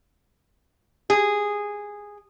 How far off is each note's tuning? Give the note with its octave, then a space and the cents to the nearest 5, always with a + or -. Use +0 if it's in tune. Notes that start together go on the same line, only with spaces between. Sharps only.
G#4 -10